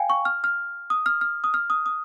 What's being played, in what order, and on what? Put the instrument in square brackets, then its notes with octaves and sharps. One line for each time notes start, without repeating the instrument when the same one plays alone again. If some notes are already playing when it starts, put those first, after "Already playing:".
Already playing: [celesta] F5 G5 G#5
C#6
F6
F6
D#6
F6
F6
D#6
F6
D#6
D#6